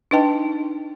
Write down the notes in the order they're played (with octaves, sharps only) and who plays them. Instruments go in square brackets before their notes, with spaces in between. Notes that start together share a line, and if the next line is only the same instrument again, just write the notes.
[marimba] D4 D#4 B4 D#5 G5 A5